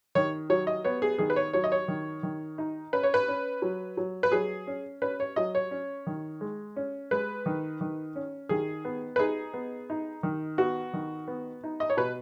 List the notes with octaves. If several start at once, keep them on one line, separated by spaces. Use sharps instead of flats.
D#3 C#5
F#3 C#5
D#5
B3 C#5
G#4
D#3 G#4
B4
C#5
F#3 C#5
D#5
C#5
D#3
D#3
D#4
C#4 B4
C#5
B4
C#4
F#3
F#3
B4
F#3 G#4
C#4
C#4 B4
C#5
F#3 D#5
C#5
C#4
D#3
G#3
C#4
G#3 B4
D#3
D#3
C#4
D#3 G#4
B3
B4
D#4 G#4
B3
D#4
D#3
B3 F#4
D#3
B3
D#4
D#5
C#5
B2 B4